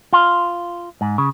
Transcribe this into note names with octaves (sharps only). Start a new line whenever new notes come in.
F4
G#2
C#3